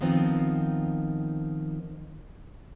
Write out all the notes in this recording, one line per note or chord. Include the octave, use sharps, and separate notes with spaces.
D#3 F3 B3 C4 D#4 F4